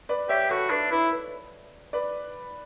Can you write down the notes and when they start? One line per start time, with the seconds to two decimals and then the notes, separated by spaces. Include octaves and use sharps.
0.09 B4 D5
0.29 G4 C#5 E5
0.50 F#4 A4 C#5
0.70 D4 B4
0.90 E4 B4
1.11 B4
1.93 B4 D5